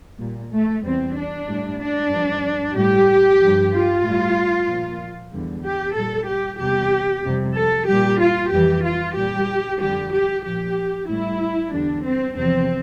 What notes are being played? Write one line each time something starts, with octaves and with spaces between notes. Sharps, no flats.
A#2 G3
A3
E2 E3 G3 C4
D4
A2 G3
D4
G2 F3
A2 G3 G4
G2 F3
F4
A2 G3
A#2 F3
E2 D3 G3
G4
A#2 G3 A4
G4
E2 C3 G3 G4
F2 C3 G3
A4
A#2 G3 G4
F4
F2 E3 G3 G4
F4
A#2 G3 G4
F2 D3 G3 G4
G4
A#2 F3 G4
A2 G3 E4
E2 D3 G3 D4
C4
E2 C3 F3 C4